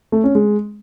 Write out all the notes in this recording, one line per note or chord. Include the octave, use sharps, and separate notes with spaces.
A3
C#4
G#3